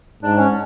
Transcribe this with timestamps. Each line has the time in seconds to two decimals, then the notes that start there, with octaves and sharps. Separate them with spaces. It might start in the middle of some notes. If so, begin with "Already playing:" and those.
0.23 G#2 D4
0.38 C#4